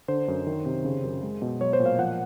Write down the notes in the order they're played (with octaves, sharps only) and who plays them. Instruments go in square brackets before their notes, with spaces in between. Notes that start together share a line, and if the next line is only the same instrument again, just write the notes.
[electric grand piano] D3 C5
F#2
D#3
C3
C#3
F#2
G#3
B2
F#3 C#5
C5
A#2
F5
F3 F#5